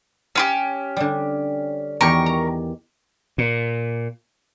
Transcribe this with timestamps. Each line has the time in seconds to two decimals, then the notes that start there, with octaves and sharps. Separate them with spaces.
0.36 C#4 F4 G4 F5
0.97 D3 G3
2.01 E2 D#3 G4 A#4 C#6
2.26 A#5
3.38 A#2